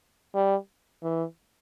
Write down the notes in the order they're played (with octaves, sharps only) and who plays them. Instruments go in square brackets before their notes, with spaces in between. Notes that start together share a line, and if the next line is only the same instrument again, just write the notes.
[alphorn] G3
E3